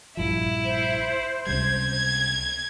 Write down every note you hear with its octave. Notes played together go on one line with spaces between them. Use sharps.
A#1 G2 F3 E4
C5
C#2 C3 G3 G#6